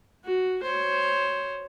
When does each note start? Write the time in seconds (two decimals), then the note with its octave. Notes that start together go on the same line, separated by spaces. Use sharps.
0.25 F#4
0.63 C5 C#5